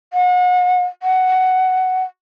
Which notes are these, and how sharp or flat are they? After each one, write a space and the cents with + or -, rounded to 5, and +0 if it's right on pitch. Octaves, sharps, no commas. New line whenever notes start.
F#5 -35
F#5 +10